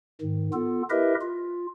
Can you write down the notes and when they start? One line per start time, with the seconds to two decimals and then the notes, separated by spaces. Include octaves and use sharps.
0.21 G#2 D#3
0.53 B3 F4 A4
0.90 E4 G4 A#4 B4 D#5 E5
1.21 F4